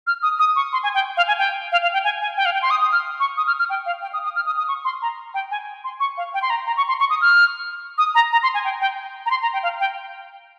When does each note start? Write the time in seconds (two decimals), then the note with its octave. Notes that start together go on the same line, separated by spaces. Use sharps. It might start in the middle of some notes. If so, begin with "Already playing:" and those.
0.07 F6
0.23 D#6
0.39 D#6
0.56 C#6
0.73 C6
0.83 G#5
0.94 G5
1.17 F5
1.28 G#5
1.38 G5
1.72 F5
1.82 F5
1.93 G5
2.04 G#5
2.21 G#5
2.37 G5
2.45 F5
2.54 G5
2.62 C6
2.71 D#6
2.82 D#6
2.92 F6
3.20 C#6
3.37 D#6
3.47 F6
3.59 F6
3.70 G5
3.86 F5
4.02 G5
4.13 D#6
4.24 D#6
4.36 F6
4.46 D#6
4.58 D#6
4.68 C#6
4.85 C6
5.02 A#5
5.34 G5
5.51 G#5
5.84 C6
6.00 C#6
6.18 F5
6.34 G5
6.42 C6
6.50 A#5
6.67 A#5
6.77 C#6
6.88 C6
7.00 C#6
7.10 D#6
7.21 F6
7.98 D#6
8.15 A#5
8.32 A#5
8.43 C6
8.54 G#5
8.64 G5
8.81 G5
9.26 A#5
9.31 C6
9.42 A#5
9.53 G5
9.63 F5
9.80 G5